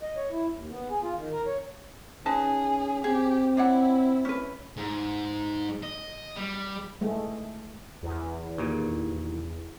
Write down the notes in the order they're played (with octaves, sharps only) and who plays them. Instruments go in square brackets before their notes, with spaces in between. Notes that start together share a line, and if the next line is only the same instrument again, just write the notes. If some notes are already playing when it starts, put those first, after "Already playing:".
[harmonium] D#5
C#5
E4
D#2
B3
G#4
F4
D#3
A#4
C#5
[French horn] C#4 [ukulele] D#4 B4 A5 [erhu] G#4
[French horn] C4 [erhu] G4 [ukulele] G#4
[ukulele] D4 C#5 F#5 [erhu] E4
[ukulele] C#4 B4
[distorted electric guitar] G#2
D#5
G3
[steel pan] G#3 A3
[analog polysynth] E2
[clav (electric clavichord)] D#2 A#2